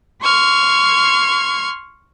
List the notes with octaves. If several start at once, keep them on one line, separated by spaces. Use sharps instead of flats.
C6 C#6 F6 G#6